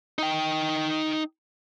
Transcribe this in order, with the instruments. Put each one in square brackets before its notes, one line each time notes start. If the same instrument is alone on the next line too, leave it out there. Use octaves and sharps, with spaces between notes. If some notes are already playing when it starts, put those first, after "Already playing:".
[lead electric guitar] D#4 G5